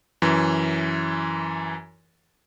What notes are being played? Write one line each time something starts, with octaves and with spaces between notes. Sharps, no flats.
F#2 E3